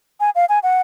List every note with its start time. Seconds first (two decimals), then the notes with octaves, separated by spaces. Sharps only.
0.20 G#5
0.35 F5
0.49 G#5
0.63 F#5